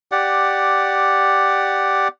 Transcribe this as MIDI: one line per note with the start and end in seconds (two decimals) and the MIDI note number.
0.12 2.08 67
0.12 2.08 74
0.12 2.08 78